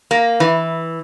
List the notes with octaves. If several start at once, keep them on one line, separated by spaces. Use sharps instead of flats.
A#3
E3